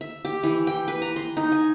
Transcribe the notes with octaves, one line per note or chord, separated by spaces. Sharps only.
E5
G4
E3
G5
B4
A#5
C6
D#4
G#5